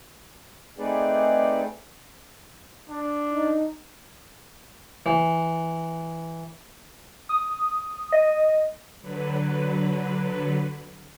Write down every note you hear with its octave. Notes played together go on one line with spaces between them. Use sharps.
A3 C4 D#4 G#4 B4 D5
D4
D#4
E3
D#6
D#5
D3 F#3 B4